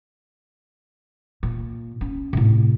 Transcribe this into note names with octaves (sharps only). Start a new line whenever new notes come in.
A#2
C#4
A2 C3